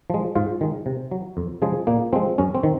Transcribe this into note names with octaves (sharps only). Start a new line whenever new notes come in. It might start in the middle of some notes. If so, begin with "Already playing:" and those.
F3 G#3
G#2 F4
D#3 G#3
C3
F#3
F2
C#3 F3 G#3 G#4
A#2 A#3
F3 G#3 C4
F#2 C#4
C4
D#3